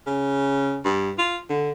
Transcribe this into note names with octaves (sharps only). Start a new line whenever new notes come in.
C#3
G2
F4
D3